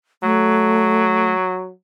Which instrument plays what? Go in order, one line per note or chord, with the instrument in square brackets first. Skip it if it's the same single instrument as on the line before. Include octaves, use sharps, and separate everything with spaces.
[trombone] F#3 [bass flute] A3